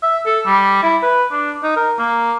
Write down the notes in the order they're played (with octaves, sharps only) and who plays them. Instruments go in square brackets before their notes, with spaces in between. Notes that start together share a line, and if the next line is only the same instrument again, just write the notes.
[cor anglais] E5
A4
G3
E4
B4
D4
D#4
A#4
A#3